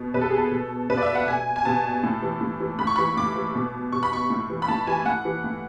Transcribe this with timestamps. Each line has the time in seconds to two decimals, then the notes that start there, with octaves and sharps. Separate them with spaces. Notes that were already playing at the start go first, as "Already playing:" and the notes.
Already playing: B2
0.14 B2 B4
0.21 A4
0.30 G#4
0.38 A4
0.51 B2
0.89 B2 B4
0.97 D5
1.02 E5
1.15 F#5
1.27 B2 G#5
1.56 G#5
1.65 B2 A5
2.03 A2
2.22 E3
2.41 A2
2.60 E3
2.79 A2 B5
2.87 C#6
2.96 E3 B5
3.17 A2 D6
3.36 E3
3.55 B2
3.92 B2 C#6
4.03 B5
4.13 C#6
4.30 A2
4.50 E3
4.62 B5
4.68 A2 A5
4.87 E3 G#5
5.06 A2 F#5
5.25 E3
5.44 A2